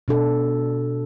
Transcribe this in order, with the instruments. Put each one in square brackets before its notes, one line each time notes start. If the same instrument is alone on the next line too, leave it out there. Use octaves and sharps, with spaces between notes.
[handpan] B2 D4 A4